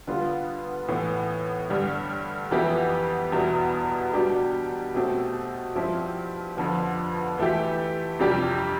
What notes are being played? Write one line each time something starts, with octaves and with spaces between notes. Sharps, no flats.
D3 G3 B3 F4
A2 E3 B3
G2 D3 G3
F2 E3 B3 E4 G4
E2 B2 G3 B3 E4
B2 G3 D4 G4
B2 A3 C4 G4
G2 F3 C4 E4 G4
F2 D3 F3 B3
E3 A3 E4 G4
F2 C3 G3 D4 G4